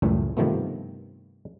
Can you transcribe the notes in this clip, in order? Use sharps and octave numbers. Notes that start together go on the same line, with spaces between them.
C#2 F#2 A2 E3 G3 A3
G2 C3 D#3 F3 A3 B3